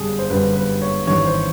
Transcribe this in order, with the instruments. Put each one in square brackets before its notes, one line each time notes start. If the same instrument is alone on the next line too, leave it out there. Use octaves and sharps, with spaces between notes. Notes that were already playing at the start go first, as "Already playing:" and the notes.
Already playing: [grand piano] G1 F#2 D3 G3 D4 G#4
C5
G1 F#2 D3 G3 B4
B4
C#5
G#1 G2 E3 G3 C#5
C5